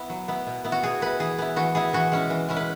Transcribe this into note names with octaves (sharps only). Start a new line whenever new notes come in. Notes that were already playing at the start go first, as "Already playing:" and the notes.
Already playing: B3 E4
F#3
B3 E4
B2
B3 E4
F#4
B2 G#4
B3 E4 B4
E3 G#4
B3 E4
E3 F#4
B3 E4 G#4
E3 F#4
G#3 C#4 E4
E3
G#3 C#4 E4
B4